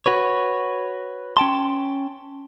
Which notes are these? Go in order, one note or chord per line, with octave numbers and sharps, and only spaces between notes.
F#4 B4 C#5
C#4 G5 A5 C6